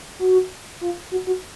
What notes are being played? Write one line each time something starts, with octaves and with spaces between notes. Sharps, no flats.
F#4
F4
F#4
F#4